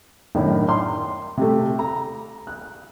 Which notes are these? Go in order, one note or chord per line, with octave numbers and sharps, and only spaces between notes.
F#2 A2 D#3 D4
C6
C3 A3
A#5
F#6